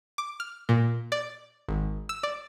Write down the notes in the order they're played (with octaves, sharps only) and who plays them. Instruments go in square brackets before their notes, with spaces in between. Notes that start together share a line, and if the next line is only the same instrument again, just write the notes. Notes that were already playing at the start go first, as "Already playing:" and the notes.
[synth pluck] D6
F6
A#2
D5
G#1
E6
D5